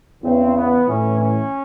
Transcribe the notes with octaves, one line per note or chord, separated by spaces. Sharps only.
E2 C#3 E3 C4
B3
A2 E3 C#4
C#4